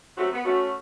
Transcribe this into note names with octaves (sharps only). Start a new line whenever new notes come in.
F#3 A3 C4 C#4 F#4 G4
B3
A3 C#4 F#4